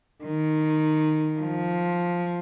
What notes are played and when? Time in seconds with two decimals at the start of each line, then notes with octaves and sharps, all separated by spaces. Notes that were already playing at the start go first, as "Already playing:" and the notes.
0.24 D#3
1.40 F3